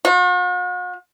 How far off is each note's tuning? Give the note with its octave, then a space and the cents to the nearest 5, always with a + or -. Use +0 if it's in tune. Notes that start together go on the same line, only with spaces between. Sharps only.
F#4 -45